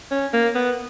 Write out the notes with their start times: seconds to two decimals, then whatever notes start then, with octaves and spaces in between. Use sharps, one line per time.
0.11 C#4
0.33 A#3
0.55 B3